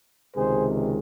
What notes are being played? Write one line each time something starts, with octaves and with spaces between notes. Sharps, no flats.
C#2 C3 D#3 G#3 G#4 C5